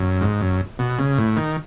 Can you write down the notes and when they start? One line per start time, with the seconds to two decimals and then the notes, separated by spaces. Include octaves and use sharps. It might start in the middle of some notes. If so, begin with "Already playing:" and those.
Already playing: F#2
0.21 G#2
0.41 F#2
0.79 B2
0.98 C#3
1.18 A2
1.37 D#3